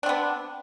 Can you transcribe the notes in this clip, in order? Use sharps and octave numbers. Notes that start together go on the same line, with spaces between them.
B3 C4 D4